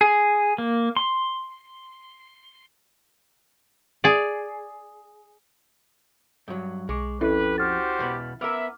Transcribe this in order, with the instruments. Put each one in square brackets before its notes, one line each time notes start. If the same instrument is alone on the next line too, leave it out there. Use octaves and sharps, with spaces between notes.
[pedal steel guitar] G#4
A#3
C6
[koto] G#4 D5
[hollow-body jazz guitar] G2 F#3
[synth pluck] B1 C#6 D6 [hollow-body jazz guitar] G#3
[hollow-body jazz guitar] F2 [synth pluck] C#4 E4 [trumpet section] G4 B4 [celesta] A4
[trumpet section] F#4 G4 C5 [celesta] F6 A6
[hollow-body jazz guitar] E2 B2 B3
[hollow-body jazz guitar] B3 A#4 [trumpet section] E5 [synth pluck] D6 F6